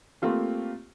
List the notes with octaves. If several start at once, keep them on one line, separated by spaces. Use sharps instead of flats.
A3 A#3 C4 F4 G4